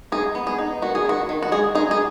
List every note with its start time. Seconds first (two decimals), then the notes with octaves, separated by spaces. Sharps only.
0.12 D#4 G#4
0.35 B3
0.47 G#4
0.58 D#4
0.82 D#3 F#4
0.95 G#4
1.05 D#3 F#4
1.29 D#3
1.43 F#4
1.52 G#3 G#4
1.75 D#4 G#4
1.91 G#4